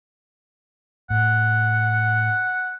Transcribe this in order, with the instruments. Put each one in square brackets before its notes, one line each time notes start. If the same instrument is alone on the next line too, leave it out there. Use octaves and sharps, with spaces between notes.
[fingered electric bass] A2 [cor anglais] F#5